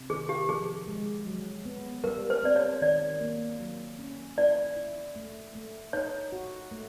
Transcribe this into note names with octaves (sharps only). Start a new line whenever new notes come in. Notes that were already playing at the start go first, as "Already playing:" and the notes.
Already playing: C3
D#3 G#4
G4
F3 G#4
G#3
F#3
B3
G3 A#4
C5
C4 D5
C#5
D#3 D5
A#3
F#3
C#4
E4 D5
E4
A3
A3
D#4 C#5
F#4
A3